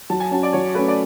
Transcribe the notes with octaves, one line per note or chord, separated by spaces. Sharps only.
F#3 A5
G#5
C#4 F#4 A5
D5
F#3 C#5
A3 C#4 B4
D5